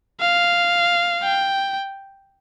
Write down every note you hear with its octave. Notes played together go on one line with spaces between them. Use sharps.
F5
G5